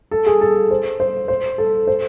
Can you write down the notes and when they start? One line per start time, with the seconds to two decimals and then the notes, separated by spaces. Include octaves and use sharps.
0.11 A4
0.26 G#4
0.41 A4
0.71 C5
1.00 C5
1.28 C5
1.58 A4
1.87 C5